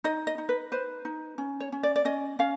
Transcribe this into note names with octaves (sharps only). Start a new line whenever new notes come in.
D#4 D#5
D#5
D#4
B4
B4 C5
D#4
C#4
C#5
C#4
D5
D5
C#4 D#5
C#4 F5